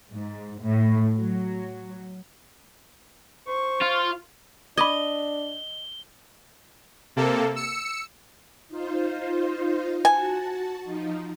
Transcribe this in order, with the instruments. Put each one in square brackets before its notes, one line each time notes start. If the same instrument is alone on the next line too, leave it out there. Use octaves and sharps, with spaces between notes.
[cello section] G#2
A2
F#3
[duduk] C5 [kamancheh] C#6
[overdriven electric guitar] F4
[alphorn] D4 [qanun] D#5 [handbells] B5 D6 G#6 [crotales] G7
[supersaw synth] C3 A#3 A4
E6 C#7
[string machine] D#4 F4 C5
[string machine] F#4 A5 [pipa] G#5
[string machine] F3 D#4